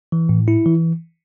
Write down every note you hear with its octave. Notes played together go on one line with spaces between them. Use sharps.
E3
A2
E4
E3